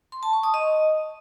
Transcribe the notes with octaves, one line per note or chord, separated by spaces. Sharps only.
C6
A5
C#6
D#6
D#5